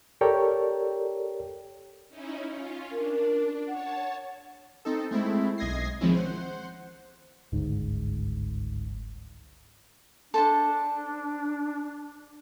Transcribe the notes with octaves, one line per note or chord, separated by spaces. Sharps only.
G4 A4 A#4 C#5 D5 G5
C#4 D#4 E4
C#4 F4
D4 A#4
C#5 F#5 A5
C4 D#4 A4
G#3 A3 C4 E4
B1 D#5 G#6 A#6 C7
D#3 F3 G#3 C4 C#4 E4
C5 F#5
G1 C#2 G#2
D4 A4 C5 A5